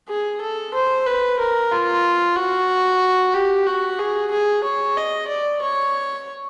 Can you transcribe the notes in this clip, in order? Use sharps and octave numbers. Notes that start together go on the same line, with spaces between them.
G#4
A4
C5
B4
A#4
F4
F#4
G4
F#4
G#4
G#4
C#5
D#5
D5
C#5